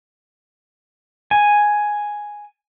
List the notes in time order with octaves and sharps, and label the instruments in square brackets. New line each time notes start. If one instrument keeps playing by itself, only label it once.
[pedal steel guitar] G#5